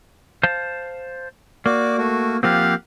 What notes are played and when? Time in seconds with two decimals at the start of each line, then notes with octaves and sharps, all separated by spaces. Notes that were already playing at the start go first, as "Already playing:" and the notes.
0.43 C5 F5 A5
1.66 A#3 F#4 D5
1.98 A3 F#4
2.43 F3 A#3 C4 G4 F5 F#5